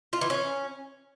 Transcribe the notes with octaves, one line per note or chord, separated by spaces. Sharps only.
F4
E3
C#4